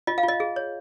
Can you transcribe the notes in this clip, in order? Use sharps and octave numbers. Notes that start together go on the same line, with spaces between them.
F4 D#5
F5
F4
D#5
G#4
C#5